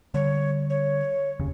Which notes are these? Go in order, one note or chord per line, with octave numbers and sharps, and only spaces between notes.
D3 G3 C#5
C#5
F1 D#2 C#3